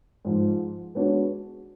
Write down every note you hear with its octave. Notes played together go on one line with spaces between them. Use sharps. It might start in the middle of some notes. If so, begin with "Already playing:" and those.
G#2 F3 G#3
G#3 B3 D4 F#4 C#5